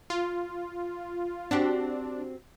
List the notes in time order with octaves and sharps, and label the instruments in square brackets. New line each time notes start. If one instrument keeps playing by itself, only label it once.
[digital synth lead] F4
[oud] C4 F#4 G4 [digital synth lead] D4